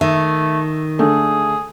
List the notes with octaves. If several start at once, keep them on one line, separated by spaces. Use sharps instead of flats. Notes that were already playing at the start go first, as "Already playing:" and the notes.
D#3 A3 E5
D3 A3 G#4